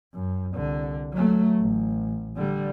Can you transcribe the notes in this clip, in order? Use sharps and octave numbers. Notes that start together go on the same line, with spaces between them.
F#2
C2 D3
F#3 A3
A1
D3 G3